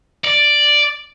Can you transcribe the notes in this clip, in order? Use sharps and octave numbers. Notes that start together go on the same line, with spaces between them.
D5